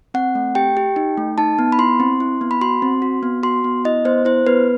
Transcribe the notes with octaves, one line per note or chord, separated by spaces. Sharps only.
C4 F#5
A3
G4 G5
G4
D#4
A3
D#4 A5
B3
B5
E4 C6
C4
E4
B3
B5
F#4 C6
C4
F#4
B3
F#4 C6
B3
E4 D#5
B3 C5
E4 C5
B3 B4